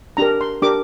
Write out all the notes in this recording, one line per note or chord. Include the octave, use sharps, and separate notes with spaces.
D4 G4 A#4 A#5
C6
D4 G4 A#4 D6